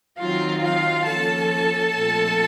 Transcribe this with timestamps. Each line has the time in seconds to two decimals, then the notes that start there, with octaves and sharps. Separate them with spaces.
0.18 D#3 F#3 C4 D#4 F4 F5
0.62 F4 F5
1.07 F3 A#3 C#4 F4 A4 A5
1.95 A#2 F3 A3 C4 F4